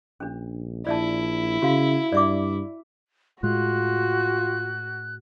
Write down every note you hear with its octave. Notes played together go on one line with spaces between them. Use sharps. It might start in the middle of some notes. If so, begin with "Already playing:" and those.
A#1 C#4 D4
A#1 E4 D5 E5 A5
C#3 F#4 F5
G2 D5 E5 D6
A2 G#3 F4 F#4 F#6